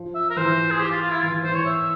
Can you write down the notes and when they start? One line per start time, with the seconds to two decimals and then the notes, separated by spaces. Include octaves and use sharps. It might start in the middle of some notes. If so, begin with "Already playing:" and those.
Already playing: F3
0.15 E5
0.30 A#4
0.36 E3 C5
0.71 G#4
0.80 G4
0.91 F4
1.02 F4
1.12 E4
1.22 E3 F4
1.44 E3 C5
1.54 C#5
1.66 E5